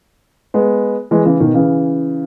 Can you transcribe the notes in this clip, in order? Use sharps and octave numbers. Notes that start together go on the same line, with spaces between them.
G#3 B3
E3 G#3
C#3 E3
B2 D#3
C#3 E3